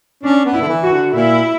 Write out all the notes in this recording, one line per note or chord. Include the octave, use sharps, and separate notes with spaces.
C#4 D4
B3
E4
D3
E3
F#4
D3
A#2 E4